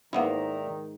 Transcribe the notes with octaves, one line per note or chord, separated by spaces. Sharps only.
G#2 D#3 A#3 B3 E4 D5 E5 A#5